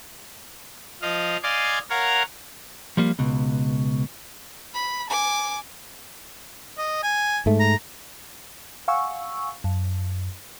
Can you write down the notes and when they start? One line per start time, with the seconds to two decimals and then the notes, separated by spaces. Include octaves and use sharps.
1.02 F3 D#5 F5
1.43 D5 D#5 F5 G#5 C6 D6
1.90 A#4 C#5 F5 F#5 A#5
2.97 F3 G3 A#3
3.19 C#2 B2
4.74 B5
5.10 G#5 D6
6.78 D#5
7.03 G#5
7.46 G#2 A3
7.60 A#5
8.88 F5 F#5 G#5 C#6 E6
9.64 F#2